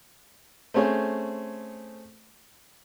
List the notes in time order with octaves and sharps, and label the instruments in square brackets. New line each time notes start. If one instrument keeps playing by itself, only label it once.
[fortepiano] A3 C4 C#4 G#4 C5